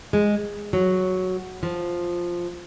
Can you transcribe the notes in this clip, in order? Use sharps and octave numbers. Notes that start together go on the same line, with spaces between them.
G#3
F#3
F3